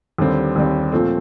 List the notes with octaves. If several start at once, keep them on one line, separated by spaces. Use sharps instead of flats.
D#2 D3 G3 C4
D#2 D3 G3 C4
A#2 F3 A3 C4